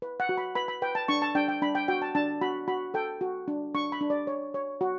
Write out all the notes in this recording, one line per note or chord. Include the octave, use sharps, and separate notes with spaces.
B4
F#5
F#4
B5
B4 B5
B5
B4 G5
A5
D4 C#6
A5
D4 G5
G5
D4 B5
G5
F#4 G5
A5
D4 A5
F#4 B5
F#4 B5
A4 G5
F#4
D4
D4 C#6
B5
D4
D5
C#5
C#5
F#4